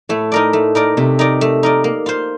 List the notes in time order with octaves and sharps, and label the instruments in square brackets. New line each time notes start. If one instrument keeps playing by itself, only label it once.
[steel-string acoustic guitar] A2 [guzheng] A3
[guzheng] D#4 A#4 D5
A3
D#4 A#4 D5
[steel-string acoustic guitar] C3 [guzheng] A3
[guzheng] D#4 A#4 D5
A3
D#4 A#4 D5
A#3
F4 C5